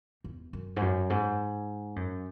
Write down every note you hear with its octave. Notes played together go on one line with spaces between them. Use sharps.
E2
F#2
G#2
F#2
G#2
F#2